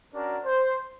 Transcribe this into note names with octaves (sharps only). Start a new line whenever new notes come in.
C#4 D4 F#4 A#4 D5 A#5
C5